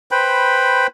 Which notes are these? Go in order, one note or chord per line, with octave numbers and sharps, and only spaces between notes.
B4 C5 G5 B5